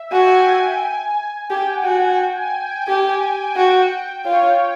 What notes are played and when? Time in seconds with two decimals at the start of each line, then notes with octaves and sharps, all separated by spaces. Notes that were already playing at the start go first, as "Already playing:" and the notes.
Already playing: E5
0.12 F#4 G#5
0.20 G5
0.27 G#5
1.49 G4 G5
1.61 G5
1.73 F#5
1.84 F#4
1.96 G5
2.19 G5
2.36 G#5
2.54 G5
2.70 G5
2.88 G4
3.56 F#4
4.25 F4 C#5